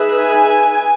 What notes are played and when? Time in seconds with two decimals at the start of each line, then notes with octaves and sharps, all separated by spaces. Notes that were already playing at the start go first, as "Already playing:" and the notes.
Already playing: D#4 G#4 B4 E5
0.21 G#5